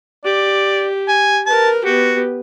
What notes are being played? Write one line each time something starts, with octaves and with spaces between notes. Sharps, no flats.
G4 D5
G#5
A#4 B4 A5
B3 F#4 G4